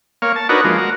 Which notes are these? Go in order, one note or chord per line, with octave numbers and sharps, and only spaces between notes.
A#3 C#5 F5
A5
D4 D#4 F#4 A#4 B4 C#5
F3 G#3 A#3
F#4 A#4